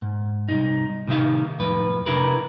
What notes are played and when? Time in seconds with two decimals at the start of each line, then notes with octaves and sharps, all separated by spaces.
0.02 G#2
0.48 C2 F#2 D#4
1.08 A2 C3 D#3 D#4 E5 F5
1.59 F2 A2 B4
2.06 C3 D4 E4 A#4 B4